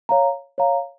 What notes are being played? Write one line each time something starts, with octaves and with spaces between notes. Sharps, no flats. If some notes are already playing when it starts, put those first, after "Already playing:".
C#5 F5 A#5
C#5 F5 A#5